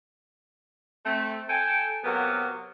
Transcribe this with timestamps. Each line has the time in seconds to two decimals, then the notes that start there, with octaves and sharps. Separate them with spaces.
1.05 A3 C4
1.49 A4 G5 G#5
2.04 C3 F#3 A#3 B3